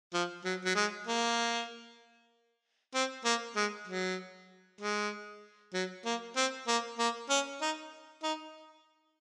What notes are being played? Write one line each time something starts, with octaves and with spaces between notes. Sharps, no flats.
F3
F#3
F#3
G#3
A#3
C4
A#3
G#3
F#3
G#3
F#3
A#3
C4
A#3
A#3
C#4
D#4
D#4